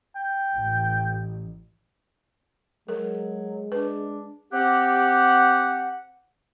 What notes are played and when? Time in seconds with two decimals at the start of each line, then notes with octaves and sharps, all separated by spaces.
0.16 G5
0.54 A1
2.89 F#3 G#3 A#4
3.72 D4 B4
4.53 C4 G4 F#5